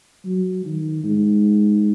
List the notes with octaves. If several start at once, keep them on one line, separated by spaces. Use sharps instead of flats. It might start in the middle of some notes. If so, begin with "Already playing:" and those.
F#3
D#3
G#2